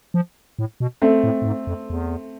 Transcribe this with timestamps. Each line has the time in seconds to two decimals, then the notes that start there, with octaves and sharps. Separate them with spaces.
0.14 F3
0.59 A2
0.80 B2
1.02 A3 C4
1.24 A2
1.42 A2
1.46 G#2
1.67 F2
1.90 E2